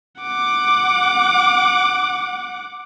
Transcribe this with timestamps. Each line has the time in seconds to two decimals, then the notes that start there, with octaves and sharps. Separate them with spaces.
0.22 F#5 D6